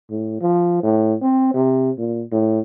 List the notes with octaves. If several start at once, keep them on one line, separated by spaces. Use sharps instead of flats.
A2
F3
A2
C4
C3
A#2
A2